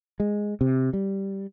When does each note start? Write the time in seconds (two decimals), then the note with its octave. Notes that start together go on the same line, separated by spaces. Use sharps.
0.20 G#3
0.61 C3
0.93 G3